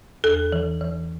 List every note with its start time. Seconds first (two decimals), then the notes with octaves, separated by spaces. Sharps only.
0.24 E2 A4
0.52 E3
0.81 E3